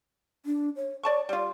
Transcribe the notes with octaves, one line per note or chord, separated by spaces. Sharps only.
D4
C#5
C#5 D5 A5 C#6
G3 F4 D5